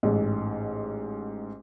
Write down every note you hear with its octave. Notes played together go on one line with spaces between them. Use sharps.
A1 G#2